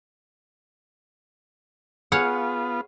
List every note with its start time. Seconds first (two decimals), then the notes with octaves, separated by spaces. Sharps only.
2.12 B3 F4 G#4 C#5 F5 F#5